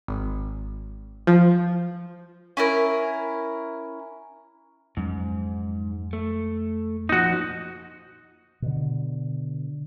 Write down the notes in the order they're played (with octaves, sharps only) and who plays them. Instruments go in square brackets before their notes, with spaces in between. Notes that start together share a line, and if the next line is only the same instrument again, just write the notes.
[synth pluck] G#1
F3
[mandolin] C#4 E4 A#4
[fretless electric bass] F2 F#3 C#4 [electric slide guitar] G#2
[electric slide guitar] A3
[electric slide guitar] A#2 F3 [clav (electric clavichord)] D#4 F#4
[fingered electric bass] B2 D3